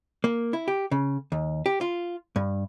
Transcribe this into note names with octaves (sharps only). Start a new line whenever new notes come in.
A#3
E4
G4
C#3
D#2
G4
F4
G2